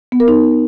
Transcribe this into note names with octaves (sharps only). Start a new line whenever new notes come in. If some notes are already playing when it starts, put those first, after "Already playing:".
B3
A#4
D#4